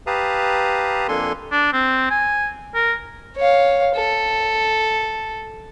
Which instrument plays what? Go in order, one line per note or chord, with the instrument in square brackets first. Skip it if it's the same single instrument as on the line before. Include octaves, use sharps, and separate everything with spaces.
[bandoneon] G4 B4 F5 A5 A#5 D#6
F2 A#3 D4 A4 G#5 C6
[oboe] D4
C4
G#5
A#4
[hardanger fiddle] C#5 F5
A4